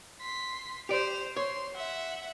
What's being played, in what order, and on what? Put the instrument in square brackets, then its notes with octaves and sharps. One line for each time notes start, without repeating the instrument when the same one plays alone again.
[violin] C6 B6
[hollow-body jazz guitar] G4 D5 [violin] C5 F7
[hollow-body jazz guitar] C#5 [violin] C6
[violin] E5 F#5